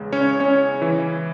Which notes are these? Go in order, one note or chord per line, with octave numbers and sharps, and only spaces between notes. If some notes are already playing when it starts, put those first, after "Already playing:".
Already playing: E2 C#3 G#3
C#4 C#5
C#4 C#5
E3 E4